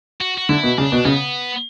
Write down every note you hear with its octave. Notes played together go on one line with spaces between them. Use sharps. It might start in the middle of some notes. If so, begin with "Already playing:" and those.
F#4
F#4
D3 E4
B2
C#3 D4
B2
C#3 B3